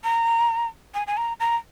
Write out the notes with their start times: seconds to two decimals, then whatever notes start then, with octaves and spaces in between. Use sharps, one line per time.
0.04 A#5
0.94 G#5
1.07 G#5
1.17 A#5
1.40 A#5